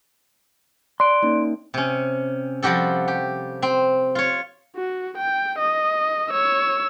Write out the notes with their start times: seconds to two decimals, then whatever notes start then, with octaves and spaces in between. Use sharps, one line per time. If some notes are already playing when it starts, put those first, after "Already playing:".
1.00 D5 C6 F#6 D7
1.23 A#3 C#4 D#4
1.74 C3 C#4
2.63 F3 G3 F#4 G4 A4
3.08 G4
3.62 C4
4.15 F4 C#5
4.76 F#4
5.17 G5
5.58 D#5
6.31 C#5 E6